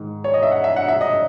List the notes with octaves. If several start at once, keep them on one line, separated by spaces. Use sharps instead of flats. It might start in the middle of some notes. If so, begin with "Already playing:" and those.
Already playing: G#2 D#3
C#5
D#5
E5
F#5
E5
F#5
E5
D#5